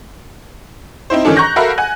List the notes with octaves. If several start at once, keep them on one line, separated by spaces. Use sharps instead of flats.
C4 D#4 E4 C5
D#3 E3 C#4 D4 A4
A#5 C#6 F#6 G6 A#6
F#4 A4 A#4 E5 F5 B5
F#5 G#5 F#6